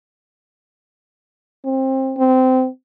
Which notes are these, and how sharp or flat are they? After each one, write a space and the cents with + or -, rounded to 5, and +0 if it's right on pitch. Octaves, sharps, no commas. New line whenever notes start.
C4 +20
C4 -20